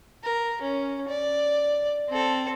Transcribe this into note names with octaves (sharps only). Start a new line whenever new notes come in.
A#4
C#4
D5
C4 A4